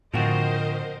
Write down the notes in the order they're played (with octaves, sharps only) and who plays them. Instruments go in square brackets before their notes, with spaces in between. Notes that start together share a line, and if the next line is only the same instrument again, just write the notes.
[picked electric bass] A2 D3 [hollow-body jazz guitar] F3 C4 F#4 [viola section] A#4 C5 D#5